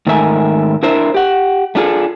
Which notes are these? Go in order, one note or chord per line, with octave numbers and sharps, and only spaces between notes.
G#2 D#3 A3 A#4 E5 G#5
D4 E4 A#4 C5 E5
G4 F#5
A3 D4 F4 G#4 A4